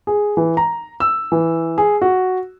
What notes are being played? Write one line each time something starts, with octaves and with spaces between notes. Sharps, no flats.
G#4
E3
A#5
E6
E3
G#4
F#4